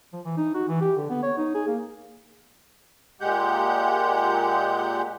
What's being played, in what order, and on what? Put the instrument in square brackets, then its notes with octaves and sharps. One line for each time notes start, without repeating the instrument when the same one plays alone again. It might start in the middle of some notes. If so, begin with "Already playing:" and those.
[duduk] F3
E3
D#4
F#4
E3
G4
D3
B3
C#5
D#4
G#4
A#3
[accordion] A#2 G#3 G4 F#5 G6